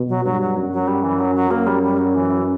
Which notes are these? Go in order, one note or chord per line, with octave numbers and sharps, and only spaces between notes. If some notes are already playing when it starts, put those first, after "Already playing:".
Already playing: B2
F#3
G2 F#3
F#3
F#2
F#3
G3
E3
F#3
F#3
F#2 A#3
G3
G3
F#3
E3